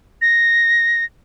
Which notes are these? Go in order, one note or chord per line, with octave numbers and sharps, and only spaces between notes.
A#6